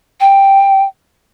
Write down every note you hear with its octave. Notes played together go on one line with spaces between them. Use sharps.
G5